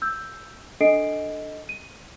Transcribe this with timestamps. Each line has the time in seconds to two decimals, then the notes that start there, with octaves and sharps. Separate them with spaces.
0.02 E6 G6
0.81 D4 A4 D#5 C7 D7
1.69 D#7